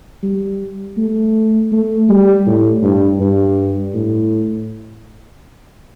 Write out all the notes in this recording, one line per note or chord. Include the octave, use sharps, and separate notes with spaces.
G3
A3
A3
G3
A2
G2
G2
A2